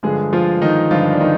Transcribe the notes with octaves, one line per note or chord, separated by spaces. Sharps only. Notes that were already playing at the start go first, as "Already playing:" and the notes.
G2 D3 F3 G#3 G#4
F3 F4
D#3 D#4
G2 D3 F3 F4
D4
D#3 D#4